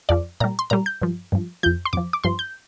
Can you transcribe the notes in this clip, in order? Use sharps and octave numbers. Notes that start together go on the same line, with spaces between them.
F2 F3 D5
A#2 G3 A#5
C6
A#2 G3 A#5
G6
G2 F3
G2 F3
F2 F3 G6
C6
F2 F3 D6
D6
G2 F3 C6
G6